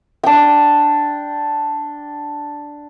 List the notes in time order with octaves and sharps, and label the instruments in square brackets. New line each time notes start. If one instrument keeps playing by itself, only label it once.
[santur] D4 G5